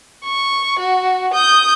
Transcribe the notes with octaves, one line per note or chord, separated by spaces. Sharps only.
C#6
F#4
D#6 G6